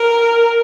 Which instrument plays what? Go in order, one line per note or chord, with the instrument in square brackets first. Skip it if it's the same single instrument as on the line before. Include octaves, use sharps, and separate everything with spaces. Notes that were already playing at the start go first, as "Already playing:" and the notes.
Already playing: [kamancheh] A#4